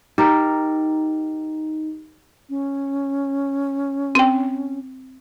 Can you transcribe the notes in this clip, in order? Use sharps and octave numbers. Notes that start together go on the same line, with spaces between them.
D#4 G4 A#4
C#4
C4 G5